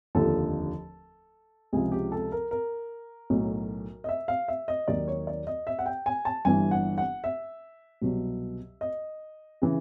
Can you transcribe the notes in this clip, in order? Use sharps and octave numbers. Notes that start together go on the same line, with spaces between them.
F1 D#2 D3 F3 A4
C#2 C3 F3 G#4
G4
A4
A#4
A#4
B1 A2 F#3
D#5
E5
F5
E5
D#5
D#2 D#3 F#3 D5
C#5
D5
D#5
E5
F#5
G5
G#5
A5
G1 G2 E3 G#5
F#5
F#5
E5
C2 B2 F#3
D#5
C#3 E3